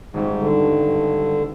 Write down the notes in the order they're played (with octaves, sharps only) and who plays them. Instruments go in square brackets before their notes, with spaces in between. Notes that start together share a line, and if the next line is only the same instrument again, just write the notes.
[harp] D#1 G#1 [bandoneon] G#2
[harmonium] D3
[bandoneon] G2